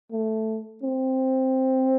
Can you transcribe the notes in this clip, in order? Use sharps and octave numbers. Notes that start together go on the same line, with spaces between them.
A3
C4